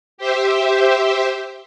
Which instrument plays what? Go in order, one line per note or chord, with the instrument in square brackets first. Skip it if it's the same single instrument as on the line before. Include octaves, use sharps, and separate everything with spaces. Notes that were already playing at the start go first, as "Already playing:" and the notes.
[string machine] G4 C5 E5